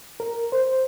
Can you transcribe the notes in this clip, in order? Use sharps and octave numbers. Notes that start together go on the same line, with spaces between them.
A#4
C5